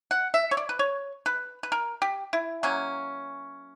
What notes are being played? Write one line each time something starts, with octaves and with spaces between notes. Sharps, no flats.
F#5
E5
C#5
D5
B4
C#5
B4
B4
A#4
G4
E4
F#3 A#3 C#4